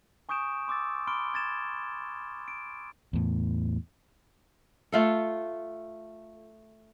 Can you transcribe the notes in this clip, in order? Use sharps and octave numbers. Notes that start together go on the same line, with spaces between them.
G#5 C#6 D#6 G6 D7 E7
C6 D6 E6 A6
B5 C6 D6 F6 D7 G7
G#6 A6 E7
D7
E2 A2
A3 F4 A4